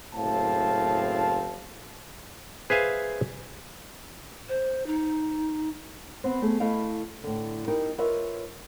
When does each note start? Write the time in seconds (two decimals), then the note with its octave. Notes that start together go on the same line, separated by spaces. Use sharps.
0.14 F#1 A2 C4 F5 A5
2.70 G#4 B4 C5 E5 F5 G#5
4.49 C5
4.87 D#4
6.24 B3 C4
6.42 A3 G#4
6.60 A3 E4 D#5 F5
7.24 A2 D3
7.68 D#4 G4 A#4
7.98 F4 A#4 B4 C#5 D#5 E5